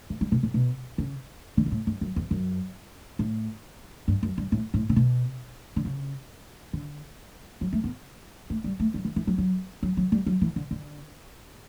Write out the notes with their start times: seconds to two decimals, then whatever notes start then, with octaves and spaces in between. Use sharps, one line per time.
0.10 A3
0.21 G3
0.32 B2
0.43 A2
0.54 B2
0.98 C#3
1.57 D3
1.66 G2
1.72 A2
1.87 G2
2.01 F#2
2.16 E2
2.31 F#2
3.19 A2
4.08 G2
4.23 F#2
4.38 G2
4.52 A2
4.74 A2
4.89 C#3
4.96 B2
5.76 D3
5.85 C#3
6.73 D3
7.61 F#3
7.73 A3
7.84 B3
8.50 A3
8.64 G3
8.80 A3
8.94 G3
9.05 E3
9.16 E3
9.27 F#3
9.38 F#3
9.83 F#3
9.97 F#3
10.12 G3
10.26 F#3
10.41 E3
10.56 D3
10.71 D3